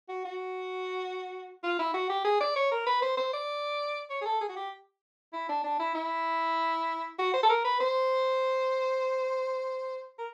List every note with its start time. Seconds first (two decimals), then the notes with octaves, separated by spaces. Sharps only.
0.09 F#4
0.25 F#4
1.63 F4
1.79 E4
1.94 F#4
2.09 G4
2.25 G#4
2.40 D5
2.56 C#5
2.71 A#4
2.86 B4
3.02 C5
3.17 C5
3.33 D5
4.10 C#5
4.21 G#4
4.26 A4
4.41 G#4
4.49 F#4
4.56 G4
5.33 E4
5.49 D4
5.64 D4
5.80 E4
5.95 E4
7.18 F#4
7.34 C5
7.43 A4
7.49 A#4
7.65 B4
7.80 C5
10.18 A#4